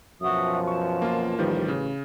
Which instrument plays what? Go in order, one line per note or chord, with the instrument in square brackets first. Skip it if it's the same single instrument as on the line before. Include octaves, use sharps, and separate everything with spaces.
[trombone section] F#2 B2 F3 [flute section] F#4 E5 D#6
[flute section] A5 [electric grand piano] C#6
[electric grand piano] A#3 F4
[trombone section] A1 B4 [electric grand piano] D#3 F3 G3
[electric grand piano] C#3